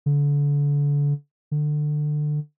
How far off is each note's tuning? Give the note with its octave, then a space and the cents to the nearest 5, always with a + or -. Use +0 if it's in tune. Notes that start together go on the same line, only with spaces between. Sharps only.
D3 -30
D3 +25